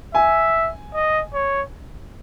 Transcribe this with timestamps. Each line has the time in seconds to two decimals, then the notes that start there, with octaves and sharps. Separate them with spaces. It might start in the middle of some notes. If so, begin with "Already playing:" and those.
0.14 E5 G#5
0.94 D#5
1.34 C#5